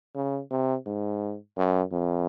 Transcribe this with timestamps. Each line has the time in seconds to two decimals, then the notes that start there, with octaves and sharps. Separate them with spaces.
0.15 C#3
0.51 C3
0.86 G#2
1.57 F#2
1.92 F2